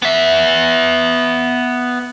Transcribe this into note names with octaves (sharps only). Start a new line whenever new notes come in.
B3 E5